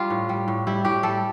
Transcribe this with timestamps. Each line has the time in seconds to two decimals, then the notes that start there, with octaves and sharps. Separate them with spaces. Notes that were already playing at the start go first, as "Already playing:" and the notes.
Already playing: G3 F4
0.10 A2
0.29 G3
0.48 A2
0.67 G3 E4
0.85 A2 G4
1.03 G3 A4